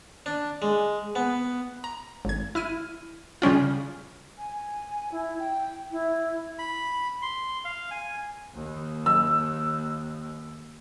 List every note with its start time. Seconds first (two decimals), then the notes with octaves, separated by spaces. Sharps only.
0.26 D4
0.62 G#3
1.15 B3
1.84 A#5
2.25 G#1 G#6
2.55 E4 F6 D#7
3.42 C#3 G3 C#4 F4
4.38 G#5
5.12 E4
5.39 G5
5.91 E4
6.59 B5
7.22 C6
7.65 F5
7.91 G#5
8.54 D#2
9.06 E6